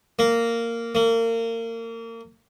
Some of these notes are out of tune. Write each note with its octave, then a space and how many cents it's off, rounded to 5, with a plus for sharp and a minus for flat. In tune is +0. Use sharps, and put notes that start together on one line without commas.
A#3 -10
A#3 -30